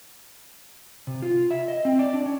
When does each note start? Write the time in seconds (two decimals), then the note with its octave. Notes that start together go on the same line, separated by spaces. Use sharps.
1.07 C3
1.22 F4
1.51 E5
1.68 D#5
1.85 C4
1.99 D5
2.13 D4
2.26 C#4